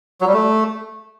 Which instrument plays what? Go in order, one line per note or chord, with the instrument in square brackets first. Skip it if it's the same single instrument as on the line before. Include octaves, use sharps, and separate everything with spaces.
[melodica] F#3
G3
A3